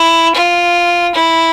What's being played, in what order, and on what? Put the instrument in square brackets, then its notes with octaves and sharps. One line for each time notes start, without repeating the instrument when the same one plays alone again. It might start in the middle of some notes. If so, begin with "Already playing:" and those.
Already playing: [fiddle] E4
F4
E4